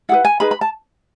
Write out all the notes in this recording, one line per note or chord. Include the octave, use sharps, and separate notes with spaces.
E4 G#4 B4 F#5
G#5
D#4 G#4 B4 B5
B5
A5